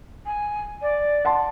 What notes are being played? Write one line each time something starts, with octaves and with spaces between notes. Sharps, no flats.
G#5
D5
F#5 A5 C6